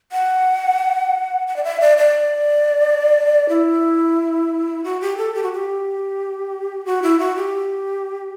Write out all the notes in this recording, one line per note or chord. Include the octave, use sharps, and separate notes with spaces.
F#5
F#5
D5
E5
D5
D5
E4
F#4
G4
A4
G4
F#4
G4
F#4
E4
F#4
G4